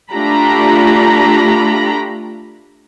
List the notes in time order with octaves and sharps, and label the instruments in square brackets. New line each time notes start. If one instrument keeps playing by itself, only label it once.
[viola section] A3 D4 F4 G4 A#5 B5